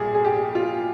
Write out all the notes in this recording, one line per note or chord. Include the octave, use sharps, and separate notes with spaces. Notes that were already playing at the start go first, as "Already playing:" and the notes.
Already playing: A#1 A#2 G3 G#4
G#4
G4
F4